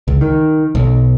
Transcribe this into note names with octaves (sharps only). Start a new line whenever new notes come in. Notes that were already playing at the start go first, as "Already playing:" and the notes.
C#2
D#3
B1